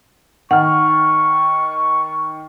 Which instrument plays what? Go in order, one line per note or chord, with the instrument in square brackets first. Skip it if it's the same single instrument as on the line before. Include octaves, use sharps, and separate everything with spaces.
[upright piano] D#3 F6 [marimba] F#5 [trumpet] C#6